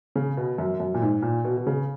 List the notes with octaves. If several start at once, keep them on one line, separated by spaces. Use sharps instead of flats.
C#3
B2
F#2
F#2
A#2
G#2
A#2
B2
B2
C#3